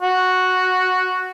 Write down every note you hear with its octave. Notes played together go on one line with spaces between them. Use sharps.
F#4